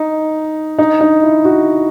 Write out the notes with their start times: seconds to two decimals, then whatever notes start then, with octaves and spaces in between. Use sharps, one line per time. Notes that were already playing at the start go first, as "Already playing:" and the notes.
Already playing: D#4
0.79 D#4
1.01 D#4
1.23 E4
1.45 F#4